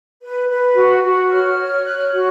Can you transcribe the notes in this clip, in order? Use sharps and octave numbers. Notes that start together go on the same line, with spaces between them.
B4
B4
F#4
F#4
C#5 F6
C#5
C#5 F#6
F6
F#4 F#6